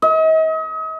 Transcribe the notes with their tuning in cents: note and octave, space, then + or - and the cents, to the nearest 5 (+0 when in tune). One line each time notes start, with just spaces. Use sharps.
D#5 +40